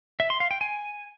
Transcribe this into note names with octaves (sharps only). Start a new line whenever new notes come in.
E5
C6
F5
G5
G#5